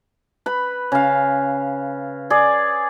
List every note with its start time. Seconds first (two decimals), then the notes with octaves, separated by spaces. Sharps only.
0.46 B4 B5
0.92 C#3 F5
2.30 G#4 D5